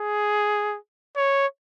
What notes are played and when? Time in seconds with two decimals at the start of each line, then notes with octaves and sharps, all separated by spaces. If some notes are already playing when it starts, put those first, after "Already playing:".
Already playing: G#4
1.16 C#5